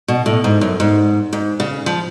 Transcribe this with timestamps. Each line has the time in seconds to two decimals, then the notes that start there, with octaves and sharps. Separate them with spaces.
0.08 B2
0.26 A2
0.44 G#2
0.61 F#2
0.80 G#2
1.33 G#2
1.60 C#3
1.86 F3